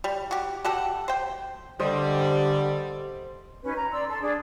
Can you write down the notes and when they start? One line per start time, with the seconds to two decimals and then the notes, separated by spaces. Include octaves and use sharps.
0.04 G3
0.31 F#4 G4
0.65 F#4 G4 A4 F#5
1.08 C5 G5
1.80 D3 G3 C5 D#5
3.63 C#4 D#4 F#4 B4
3.76 A#5
3.91 D5 C6 E6
4.08 A4 C6
4.22 D4 G#4 D5